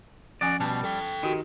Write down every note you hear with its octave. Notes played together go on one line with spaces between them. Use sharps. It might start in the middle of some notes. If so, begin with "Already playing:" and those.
F3 C#4 F#4 D5 G#5
B2 G3 A5
A4 G5
D#3 D#4 F#4 G4